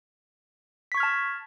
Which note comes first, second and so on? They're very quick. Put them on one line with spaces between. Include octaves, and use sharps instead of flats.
B6 C#6 G#6 F6 A5